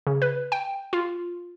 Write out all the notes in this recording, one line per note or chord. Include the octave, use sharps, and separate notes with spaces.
C#3
B4
G5
F4